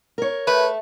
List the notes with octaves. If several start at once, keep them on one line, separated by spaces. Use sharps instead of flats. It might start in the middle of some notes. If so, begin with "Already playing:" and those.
A#4 C#5
A3 B4